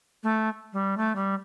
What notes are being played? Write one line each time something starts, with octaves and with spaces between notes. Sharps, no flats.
A3
G3
A3
G3